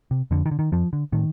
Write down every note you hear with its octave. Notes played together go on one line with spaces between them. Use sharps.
C3
F2 D3
D#3
D3
D#3
F2 F3
D3
A2 D#3